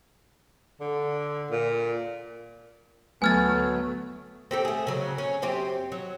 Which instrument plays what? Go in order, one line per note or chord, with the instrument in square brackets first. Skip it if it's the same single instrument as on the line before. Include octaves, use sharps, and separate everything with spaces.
[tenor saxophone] D3
A#2
[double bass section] D2 F#3 A3 [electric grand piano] B3 G#6 [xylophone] G#5 F6 A6
[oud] C4 G4 A4
A3 G#4
C#3 F#3
C#4
F#2 C4 G4
F#3